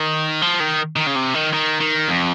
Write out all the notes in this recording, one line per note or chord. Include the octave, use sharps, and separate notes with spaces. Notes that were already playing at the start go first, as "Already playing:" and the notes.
Already playing: D#3
F3
D#3
D#3
C#3
C3
D#3
D#3
D#3
F2